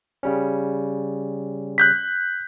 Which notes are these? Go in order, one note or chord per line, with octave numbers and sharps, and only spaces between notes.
C#3 G3 C#4
F#6 G6 B6